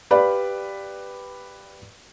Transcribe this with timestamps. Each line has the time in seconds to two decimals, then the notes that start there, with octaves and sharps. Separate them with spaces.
0.11 G4 B4 D5 F5 B5